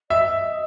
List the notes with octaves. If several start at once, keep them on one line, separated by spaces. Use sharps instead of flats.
D#5 E5